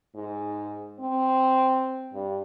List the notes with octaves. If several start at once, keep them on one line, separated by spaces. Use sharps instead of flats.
G#2
C4
G2